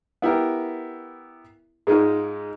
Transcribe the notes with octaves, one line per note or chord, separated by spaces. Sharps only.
B3 E4 G4 A#4
G#2 G#3 D#4 F4